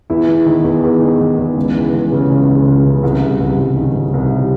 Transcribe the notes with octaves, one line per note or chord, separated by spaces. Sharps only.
E2 E4
E2
D#3
E2
E2
D#3
D#3
E2
C#2
E3
C#2
C#3
C#2
C#2
C#2
C#3
C2
C2
C2
C2
D#3
C2
C2
C3